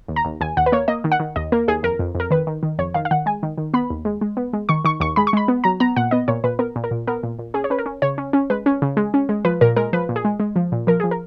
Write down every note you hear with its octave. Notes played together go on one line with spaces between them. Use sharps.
D#2
A#5
D#2
D#2 G#5
D#2 F#5
B4
A#3 C#5
A#3 D#5
D#3
F#5
D#3
D#2 D#5
A#3 A#4
D#2 G#4
F2 A#4
F2
F2
A#4
D#3 B4
D#3
D#3
F2 C#5
D#3 F5
F5
D#3 F#5
G#3 G#5
D#3
D#3
B3 B5
D#2
G#3
G#3
B3
G#3
D#3 C#6
D#3 C#6
D#2 C#6
G#3 B5
C#6
G#3 B5
B3
F#3 A#5
B3 A#5
A#2 F#5
B3 D#5
A#2 C#5
A#2 B4
B3 A#4
A#2
A#4
A#2
B3 A#4
A#2
A#2
C#4 G#4
C#5
C#4 B4
A#4
C#4
C#3 C#5
C#4
C#4
G#3 B4
C#4
C#3
G#3
C#4
G#3
F3 B4
A#2 A#4
G#3 A#4
F3 B4
A#2
G#4
G#3
G#3
F3
A#2
F3 A#4
F3 G#4
A#4